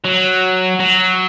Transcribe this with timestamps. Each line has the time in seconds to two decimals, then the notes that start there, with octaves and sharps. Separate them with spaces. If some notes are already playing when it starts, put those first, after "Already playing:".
0.04 F#3
0.80 F#3